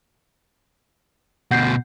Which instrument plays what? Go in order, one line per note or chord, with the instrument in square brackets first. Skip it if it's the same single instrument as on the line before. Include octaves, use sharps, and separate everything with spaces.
[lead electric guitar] D2 B2 [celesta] F#5 G6 C7